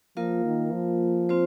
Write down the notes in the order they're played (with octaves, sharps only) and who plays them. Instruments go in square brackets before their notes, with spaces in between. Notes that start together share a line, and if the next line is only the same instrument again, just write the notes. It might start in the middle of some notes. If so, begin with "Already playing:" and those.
[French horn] F3 [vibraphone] A#3 F4 A#4 F5
[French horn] D#3
F3
[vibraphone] C4 F4 C5